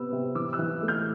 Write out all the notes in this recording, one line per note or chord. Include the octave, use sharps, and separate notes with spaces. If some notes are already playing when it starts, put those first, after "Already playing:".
Already playing: C3 B3 E6
C3
E3 D6 E6
E6 F#6
E3
A3
F6 G6